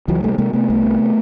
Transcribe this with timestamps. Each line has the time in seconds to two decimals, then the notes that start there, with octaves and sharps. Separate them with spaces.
0.08 C#2 E3 F#3
0.22 C3 G3 A3
0.33 A3
0.38 C3 G#3 A#3
0.53 C3 A3 B3
0.69 C2 A3 B3
0.84 C3